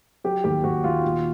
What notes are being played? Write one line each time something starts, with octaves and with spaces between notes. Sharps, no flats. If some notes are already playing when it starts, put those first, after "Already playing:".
F#3 G4
D#2 G4
D#2 F#4
D#2 F4
A#2